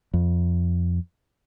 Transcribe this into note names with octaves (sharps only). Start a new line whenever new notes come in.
F2